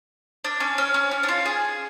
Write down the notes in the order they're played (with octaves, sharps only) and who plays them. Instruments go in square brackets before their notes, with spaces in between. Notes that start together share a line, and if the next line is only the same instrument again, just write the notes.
[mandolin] D4
C#4
C#4
C#4
C#4
D4
F4
G#4